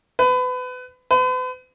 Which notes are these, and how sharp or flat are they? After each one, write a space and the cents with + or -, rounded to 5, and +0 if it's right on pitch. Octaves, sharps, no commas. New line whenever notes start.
B4 +30
B4 +45